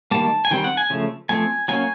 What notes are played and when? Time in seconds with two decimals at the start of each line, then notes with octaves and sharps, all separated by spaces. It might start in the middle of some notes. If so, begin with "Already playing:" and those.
0.11 D#3 G3 A#3 A5
0.45 G#5
0.51 D#3 G3 C4 G5
0.64 F#5
0.77 G#5
0.90 C#3 F3 A3
1.29 F3 A3 C4 G#5
1.68 F#3 A#3 C#4 G#5